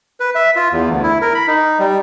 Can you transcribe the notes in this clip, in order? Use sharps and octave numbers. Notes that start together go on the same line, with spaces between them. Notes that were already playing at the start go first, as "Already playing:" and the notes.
B4
E5
F4
E2
D2
E4
A#4
B5
D#4
G3